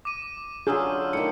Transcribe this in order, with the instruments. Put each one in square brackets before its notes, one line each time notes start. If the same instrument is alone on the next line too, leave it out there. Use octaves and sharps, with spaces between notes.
[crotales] D6 D#7
[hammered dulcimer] D3 F#3 F4 [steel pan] G#4 [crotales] E6 F6 G6
[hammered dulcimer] A2 D#3 [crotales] C#7